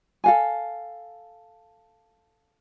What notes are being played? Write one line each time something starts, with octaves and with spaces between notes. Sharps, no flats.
A4 F5 G#5